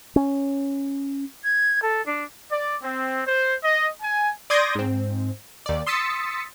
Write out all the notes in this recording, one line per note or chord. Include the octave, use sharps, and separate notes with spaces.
C#4
G#6
A4
D4
D5
C4
C5
D#5
G#5
D5 C6 D#6 G6 G#6 A#6
G#2 C4
D#2 D5
C6 D#6 E6 A6 B6 C#7